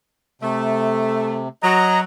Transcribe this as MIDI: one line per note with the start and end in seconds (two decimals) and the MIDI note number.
0.42 1.48 48
0.42 1.45 57
1.63 2.03 54
1.63 2.00 75
1.63 2.00 82